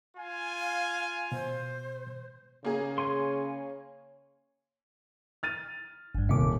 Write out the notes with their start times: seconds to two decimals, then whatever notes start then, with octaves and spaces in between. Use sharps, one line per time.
0.17 F4 G#5
0.59 F5
1.32 B2 C5
2.65 C#3 A#3 G#4
2.98 C#5 G#5 C6
5.43 F6 A6 D#7
6.15 G1 G2
6.29 D#1 C3 D#3 D6